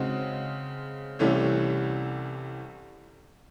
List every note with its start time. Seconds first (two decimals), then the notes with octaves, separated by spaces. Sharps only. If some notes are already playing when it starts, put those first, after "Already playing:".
Already playing: C#3 G#3 C4 D#4 F#4
1.19 C2 C3 E3 A3 C#4